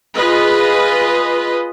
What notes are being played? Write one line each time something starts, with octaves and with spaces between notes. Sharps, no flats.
F4 G#4 B4 D#5